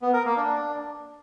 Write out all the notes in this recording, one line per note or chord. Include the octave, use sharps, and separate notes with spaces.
B3
A#4
A#3
D4